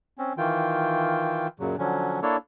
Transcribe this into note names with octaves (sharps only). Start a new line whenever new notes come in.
C4 C#4
D#3 E3 F4 G5
F#2 A#2 C#3 F#3
D3 F3 F#3 C#4
A#3 D4 E4 A4 C#5 D5